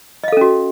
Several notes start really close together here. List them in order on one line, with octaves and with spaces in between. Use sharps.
D#5 F5 A4 C#4 F#4